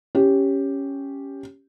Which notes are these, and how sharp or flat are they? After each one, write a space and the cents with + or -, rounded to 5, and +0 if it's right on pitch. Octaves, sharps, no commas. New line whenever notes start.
C#4 +0 G4 +0